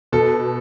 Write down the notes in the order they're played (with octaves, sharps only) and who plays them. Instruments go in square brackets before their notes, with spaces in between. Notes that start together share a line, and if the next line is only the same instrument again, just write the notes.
[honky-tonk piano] B2 [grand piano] A4